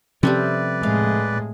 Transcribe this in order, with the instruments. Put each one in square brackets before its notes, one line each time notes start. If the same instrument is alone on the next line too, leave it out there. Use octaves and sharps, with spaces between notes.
[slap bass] C3 F3 C#4 [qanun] G3 A3 C4 [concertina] B4 D5
[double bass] A2 G#3 [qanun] F5